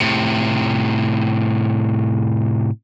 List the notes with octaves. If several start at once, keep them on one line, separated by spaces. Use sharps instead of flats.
A2 C3